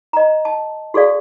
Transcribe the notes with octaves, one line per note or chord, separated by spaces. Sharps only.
D#5 A#5
A5
F#4 G#4 A4 D5 F5